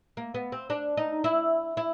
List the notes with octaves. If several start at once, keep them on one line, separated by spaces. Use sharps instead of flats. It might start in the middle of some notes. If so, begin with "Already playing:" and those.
A#3
B3
C4
D4
D#4
E4
E4